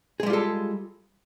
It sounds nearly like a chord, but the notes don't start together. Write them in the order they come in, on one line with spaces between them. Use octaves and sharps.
G#4 G#3 G3 F4 A4